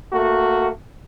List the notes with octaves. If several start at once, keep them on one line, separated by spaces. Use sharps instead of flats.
A3 A#3 F#4